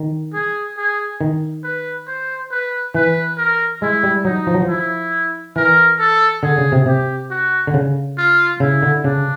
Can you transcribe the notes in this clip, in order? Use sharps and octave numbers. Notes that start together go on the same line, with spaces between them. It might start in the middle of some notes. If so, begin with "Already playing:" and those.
Already playing: D#3
G#4
G#4
D#3
B4
C5
B4
E3 B4
A#4
G#3 E4
G3
F#3 D#4
F3
F#3
F3
E4
E3 A#4
A4
D3 G#4
C#3
C3
C3 G4
F#4
D3
C#3
F4
C#3 E4
D3
C#3 D4